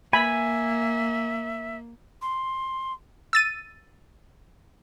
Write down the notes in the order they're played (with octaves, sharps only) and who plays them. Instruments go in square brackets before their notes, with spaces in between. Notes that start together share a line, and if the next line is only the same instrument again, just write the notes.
[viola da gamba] A#3 [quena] E5 [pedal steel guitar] G#5 [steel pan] B5
[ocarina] C6
[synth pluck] E6 A6 D#7